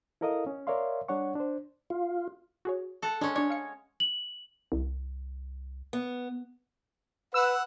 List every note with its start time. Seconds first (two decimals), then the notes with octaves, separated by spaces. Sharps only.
0.21 E4 A4 A#4 D#5 F5 D#6
0.46 C#4
0.67 A#4 C#5 D5 E5 F5 C6
1.08 G3 D4 C#5 F#5 C#6
1.35 D4 C5
1.90 F4
2.65 F#4 G#4 C#5
3.02 A4 F#5
3.21 G#3 C#4 D4
3.36 D4 C#5 D5
3.50 F5 C#7
4.00 F#7
4.72 C2
5.93 B3
7.34 B4 F#5 E6